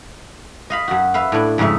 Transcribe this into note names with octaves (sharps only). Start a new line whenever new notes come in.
D#5 F5 B5
F#2 F#4
B4 E5 F5
A2 D4
F2 G#2 C#3 D#4 E5